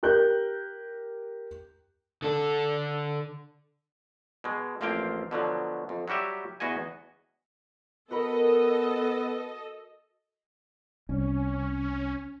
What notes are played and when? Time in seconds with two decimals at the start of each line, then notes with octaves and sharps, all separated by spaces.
0.03 G4 A#4 F#6 G6
2.22 D3 A4
4.44 B2 G#3
4.81 A1 F3 A#3 C4 F5 G5
5.31 B2 D3 F3 F#3
5.89 F2
6.08 F#3 G3 F#4 G4 E5
6.60 E2 B3 F#4 D#5 G#5
8.11 B3 F#4 A4 A#4 D#5 B5
11.09 C2 C#4